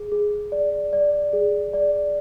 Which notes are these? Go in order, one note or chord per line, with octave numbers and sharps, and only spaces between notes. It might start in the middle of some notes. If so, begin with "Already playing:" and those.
Already playing: G#4
G#4
D5
D5
G#4
D5